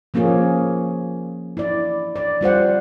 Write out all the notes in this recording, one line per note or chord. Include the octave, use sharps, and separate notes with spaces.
F3 A#3 C#4 F4 G#4
E4 D5
D5
G3 F4 C5 F#5